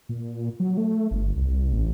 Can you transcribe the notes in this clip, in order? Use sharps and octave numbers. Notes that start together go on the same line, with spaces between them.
A#2
F#3
A3
G1
C2
A1